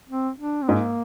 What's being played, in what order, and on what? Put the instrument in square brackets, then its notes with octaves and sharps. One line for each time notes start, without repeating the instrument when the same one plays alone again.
[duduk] C4
D4
C4
[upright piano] G#2 [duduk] A#3